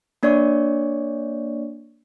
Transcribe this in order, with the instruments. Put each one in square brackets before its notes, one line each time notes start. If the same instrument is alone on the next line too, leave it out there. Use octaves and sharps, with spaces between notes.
[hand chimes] A#3 D4 C#5 D5 C#6